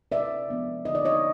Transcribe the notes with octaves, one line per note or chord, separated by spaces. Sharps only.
C3 D5 E5
F3 G#3 B3 D4
D3 D#5
D5
C#5 D#5